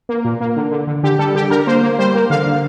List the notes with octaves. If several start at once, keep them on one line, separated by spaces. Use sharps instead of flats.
A#3
A#2
A#3
D3
D3
D3
D3 G4
G3 A4
D3 G4
D3 A#4
A#3 C5
A#3
G3 C5
A#3
D3 F5
D3